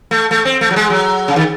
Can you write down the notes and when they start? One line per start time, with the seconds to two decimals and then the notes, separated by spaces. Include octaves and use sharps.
0.11 A3
0.31 A3
0.45 C4
0.61 A3
0.71 F#3
0.76 G#3
0.90 F#3
1.28 C#3
1.36 D#3